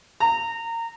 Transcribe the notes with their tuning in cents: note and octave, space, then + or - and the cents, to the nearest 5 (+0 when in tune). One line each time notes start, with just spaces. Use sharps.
A#5 -25